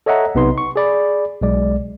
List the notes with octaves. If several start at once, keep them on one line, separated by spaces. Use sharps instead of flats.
A4 C#5 D#5 E5 F#5 A#5
B1 C3 B3 D#4 B4 C6
C#6
G#4 D5 B5
B1 G#3 D5